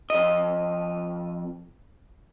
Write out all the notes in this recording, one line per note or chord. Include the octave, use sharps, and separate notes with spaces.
F2 D#5